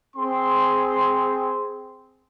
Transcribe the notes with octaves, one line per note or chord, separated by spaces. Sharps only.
C4 G#4 C6